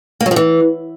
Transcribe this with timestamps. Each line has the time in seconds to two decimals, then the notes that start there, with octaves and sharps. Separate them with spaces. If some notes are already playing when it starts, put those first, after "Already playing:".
0.21 A#3
0.26 F#3
0.31 F3
0.36 E3